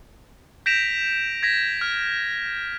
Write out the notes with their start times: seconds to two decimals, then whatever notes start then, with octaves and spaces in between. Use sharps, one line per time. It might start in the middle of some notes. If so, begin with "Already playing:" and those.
0.66 G6 A#6 B6 D7 E7 F7
1.43 G#6 A#6 B6
1.81 F6